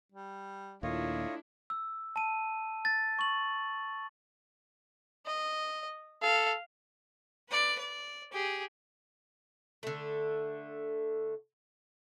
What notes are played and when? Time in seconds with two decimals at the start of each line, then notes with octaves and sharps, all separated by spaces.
0.12 G3
0.83 D#2 A#2 A3 D4 E4 F4 C#5 D#5
1.70 E6
2.16 A5 D#7
2.85 A6
3.19 C#6 F#7
5.26 D#5
6.22 A4 F5
7.49 B4 D5
7.79 D5
8.32 G4 G#4
9.83 D3 A3